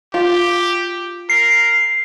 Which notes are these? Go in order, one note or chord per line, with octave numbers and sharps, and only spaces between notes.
F4 G4
A#4 C7